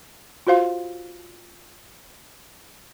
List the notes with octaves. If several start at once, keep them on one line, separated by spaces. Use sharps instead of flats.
F4 F#4 C5 F5